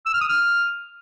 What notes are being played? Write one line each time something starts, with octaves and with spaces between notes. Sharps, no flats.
E6
F6
D#6
F6